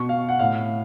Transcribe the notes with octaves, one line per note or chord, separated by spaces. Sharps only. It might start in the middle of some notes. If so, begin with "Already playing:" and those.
Already playing: B2 C#6
F5
F#5
A2 F5